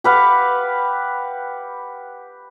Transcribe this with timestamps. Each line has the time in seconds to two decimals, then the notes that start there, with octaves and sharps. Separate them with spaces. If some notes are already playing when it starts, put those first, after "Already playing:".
0.04 G4 B4 F5 F#5